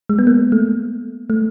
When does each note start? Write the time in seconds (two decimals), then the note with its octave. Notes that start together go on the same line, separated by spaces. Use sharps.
0.09 G#3
0.19 B3
0.27 A#3
0.52 A3
1.30 A3